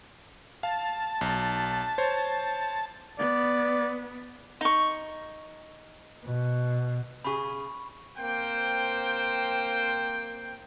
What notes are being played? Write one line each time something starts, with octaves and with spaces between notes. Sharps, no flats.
F5 A5
B1
C5 C#5
B3 D5
D#4 C#6
B2
C#3 G#4 B5 C#6
A#3 C4 C5 G5